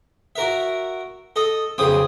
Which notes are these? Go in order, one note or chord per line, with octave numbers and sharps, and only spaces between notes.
F#4 A#4 E5
A4 D#5
B1 F2 C#3 D#6